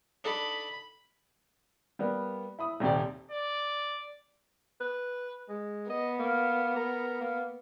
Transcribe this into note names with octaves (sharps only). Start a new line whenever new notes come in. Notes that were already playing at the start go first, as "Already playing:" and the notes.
D4 D#4 A4 B5
G3 A#3 B3
E4 B5 D#6
D#1 D#2 C3 G4 D5
D5
B4
G#3
B3 D#5
A#3
A#4
A#3